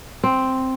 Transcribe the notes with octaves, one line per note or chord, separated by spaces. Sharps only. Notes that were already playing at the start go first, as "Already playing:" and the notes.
C4